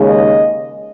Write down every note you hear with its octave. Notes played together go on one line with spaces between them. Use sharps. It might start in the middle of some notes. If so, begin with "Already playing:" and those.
Already playing: D#2 C#3 G#3 C#4
D#5